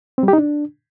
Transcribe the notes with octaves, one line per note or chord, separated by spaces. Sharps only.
C4
G3
G4
D#4
D4